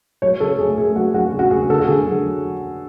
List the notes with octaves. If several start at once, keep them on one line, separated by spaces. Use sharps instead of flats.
F#3 C#5
C#3 A4
A3 G#4
A3 G#4
F#3 F#4
F#3 F#4
C#3
F#4
C#3 G#4
D3 A4
F#4
D3 G#4
F#3